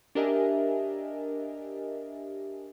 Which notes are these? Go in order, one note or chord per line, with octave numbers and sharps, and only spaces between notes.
D4 G4 A#4 D#5 E5 G#5